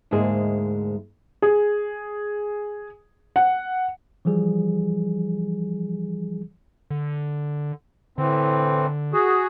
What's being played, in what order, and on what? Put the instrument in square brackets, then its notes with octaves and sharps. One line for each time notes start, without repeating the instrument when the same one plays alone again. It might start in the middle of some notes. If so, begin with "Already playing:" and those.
[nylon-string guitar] D2 G#2 G#3 A#3 G#4 C5
[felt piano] G#4
F#5
[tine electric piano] E3 F3 G3 G#4
[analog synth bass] D3
[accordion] A2 E3 C4 [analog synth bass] D3
[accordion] F#4 G#4